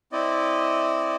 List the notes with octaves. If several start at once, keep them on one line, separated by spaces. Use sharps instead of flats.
C4 E4 D5 D#5